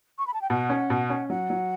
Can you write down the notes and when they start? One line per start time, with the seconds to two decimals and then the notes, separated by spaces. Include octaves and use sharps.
0.18 C#6
0.27 B5
0.34 A5
0.42 G5
0.50 B2 F#5
0.70 C#4
0.90 B2
1.10 C#4
1.29 F#3 F#5
1.50 F#3